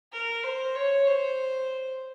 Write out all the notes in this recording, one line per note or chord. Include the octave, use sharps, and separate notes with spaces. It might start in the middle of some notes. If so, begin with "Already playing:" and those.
A#4
C5
C#5
C5